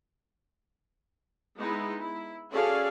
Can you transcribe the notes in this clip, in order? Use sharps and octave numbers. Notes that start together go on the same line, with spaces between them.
G#3 B3 D#4 E4
E4
C#4 F#4 G#4 A4 D5 F5